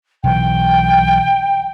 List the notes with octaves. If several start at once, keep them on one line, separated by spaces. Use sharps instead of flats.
B1 E3 G5